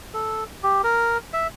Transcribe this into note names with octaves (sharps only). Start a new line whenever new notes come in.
A4
G4
A#4
E5